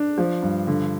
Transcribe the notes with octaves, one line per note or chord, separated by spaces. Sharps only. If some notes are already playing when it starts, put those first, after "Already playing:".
Already playing: D4
F3
G2
D3